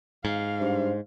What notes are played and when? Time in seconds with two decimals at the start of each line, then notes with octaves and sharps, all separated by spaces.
0.25 G#2 F5
0.61 G2 C5